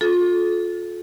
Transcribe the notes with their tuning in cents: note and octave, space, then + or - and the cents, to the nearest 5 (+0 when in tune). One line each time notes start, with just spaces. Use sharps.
F4 +25 A4 -25